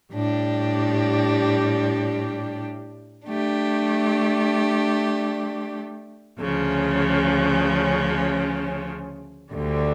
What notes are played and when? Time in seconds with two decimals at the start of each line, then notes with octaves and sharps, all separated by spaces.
0.13 A2 G3 D4 G4
3.27 A3 D4 G4
6.40 D2 C#3 F3 C#4
9.54 D2 D3 G3